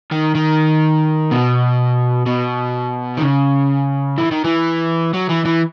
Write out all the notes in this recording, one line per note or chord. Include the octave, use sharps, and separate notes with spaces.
D#3
D#3
B2
B2
D#3
C#3
E3
D#3
E3
F#3
E3
E3